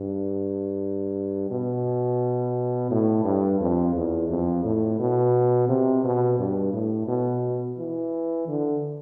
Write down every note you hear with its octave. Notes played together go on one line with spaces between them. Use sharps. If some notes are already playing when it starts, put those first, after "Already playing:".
Already playing: G2
B2
A2
G2
F2
E2
F2
A2
B2
C3
B2
G2
A2
B2
E3
D3